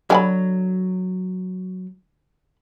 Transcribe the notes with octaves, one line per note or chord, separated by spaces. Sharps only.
D3 F#3 G#5 B5